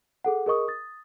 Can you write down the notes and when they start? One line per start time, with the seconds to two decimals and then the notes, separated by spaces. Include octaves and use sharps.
0.25 G#4 A4 F#5
0.46 G#4 A#4 D#5 C#6 D#6
0.68 D#6 A6